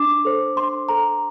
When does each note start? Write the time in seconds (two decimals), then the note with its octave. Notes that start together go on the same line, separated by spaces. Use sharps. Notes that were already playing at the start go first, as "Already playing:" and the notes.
Already playing: D4 D6
0.25 A4 C5
0.56 D4 C6
0.89 A4 C5 A#5